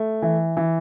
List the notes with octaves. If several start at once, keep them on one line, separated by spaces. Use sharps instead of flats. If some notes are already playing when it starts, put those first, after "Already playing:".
Already playing: A3
E3
E3